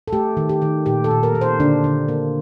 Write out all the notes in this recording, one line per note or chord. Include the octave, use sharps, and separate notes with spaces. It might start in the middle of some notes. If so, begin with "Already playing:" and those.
A4
A3 G4
D#3
G4
D#3
A#2 G4
A4
A#2
A#4
A#3
C5
D3 D4
D3
A#3